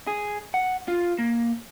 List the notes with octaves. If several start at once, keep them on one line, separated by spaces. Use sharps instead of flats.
G#4
F#5
F4
A#3